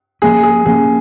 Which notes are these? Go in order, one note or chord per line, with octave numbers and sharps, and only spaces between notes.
F3 A#3 C#4 G#4
G#4
F3 A#3 C#4 G#4